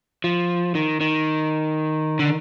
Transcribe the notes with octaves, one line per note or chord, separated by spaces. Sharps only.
F3
D#3
D#3
D3